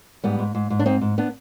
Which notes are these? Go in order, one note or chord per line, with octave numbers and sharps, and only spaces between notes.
G#2 G3 B3
G#2
G#2
G#2
D4
G#2 C4 D#4
G#2
B3 D4